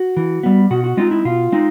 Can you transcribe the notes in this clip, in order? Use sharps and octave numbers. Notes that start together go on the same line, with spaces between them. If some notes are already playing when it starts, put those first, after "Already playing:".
Already playing: F#4
E3
G3 B3
B2 F#4
F#4
G#3 C4 D#4 F4
E4
B2 F4
G#3 C4 D#4